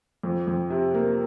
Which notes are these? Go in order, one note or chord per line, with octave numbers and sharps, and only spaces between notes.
F2
F2
C3
A#3